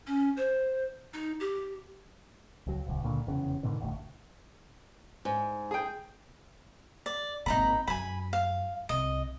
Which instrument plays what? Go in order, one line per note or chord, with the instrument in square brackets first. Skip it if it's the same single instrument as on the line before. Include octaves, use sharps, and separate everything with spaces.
[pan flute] C#4
C5
D#4
G4
[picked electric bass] C#2 F#3
D#1 C#2
C#2 A#2 D3
F1 E2 C#3
G#2 B2 D3 D#3
E1 A1 D2
[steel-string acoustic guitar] G#2
[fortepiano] G#4 G5
[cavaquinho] D5
[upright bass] G#1 A#3 [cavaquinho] D#4 A#5 B5
[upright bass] F#2 [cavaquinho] G#5 B5
[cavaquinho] F5
[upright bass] C2 [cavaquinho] D#5